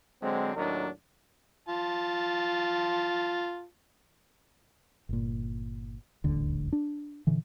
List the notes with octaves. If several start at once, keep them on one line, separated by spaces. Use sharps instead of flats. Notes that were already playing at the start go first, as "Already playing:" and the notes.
D3 F#3 G#3 C4
D#2 A2 F#3 D4 D#4 A#4
F4 A5
G1 A#2
D#1 A1 D2 D3
D4
A#2 D3 E3